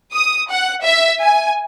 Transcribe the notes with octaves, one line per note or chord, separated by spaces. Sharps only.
D#6
F#5
E5
G#5